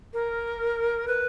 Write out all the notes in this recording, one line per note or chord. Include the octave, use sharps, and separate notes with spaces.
A#4
B4